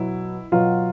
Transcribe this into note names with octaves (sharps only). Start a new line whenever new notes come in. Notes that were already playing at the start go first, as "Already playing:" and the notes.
Already playing: B2 F#3 E4
B2 F#3 F4